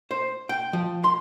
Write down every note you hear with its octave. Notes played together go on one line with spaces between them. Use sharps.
C5
G5
F3
C6